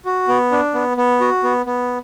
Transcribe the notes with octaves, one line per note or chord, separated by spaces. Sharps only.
F#4
B3
D4
B3
B3
F#4
B3
B3